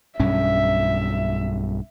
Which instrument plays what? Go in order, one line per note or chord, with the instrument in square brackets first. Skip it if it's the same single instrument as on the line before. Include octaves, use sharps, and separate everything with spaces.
[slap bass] B1 G2 C#4 [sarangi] E5